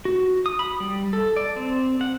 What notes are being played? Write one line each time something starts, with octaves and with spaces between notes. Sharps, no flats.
F#4
D#6
B5
G3
A4
D5
C4
F#5